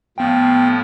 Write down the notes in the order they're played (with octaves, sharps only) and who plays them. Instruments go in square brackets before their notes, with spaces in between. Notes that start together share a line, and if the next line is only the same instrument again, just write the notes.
[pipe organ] A2 F3 [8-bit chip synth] B3 G5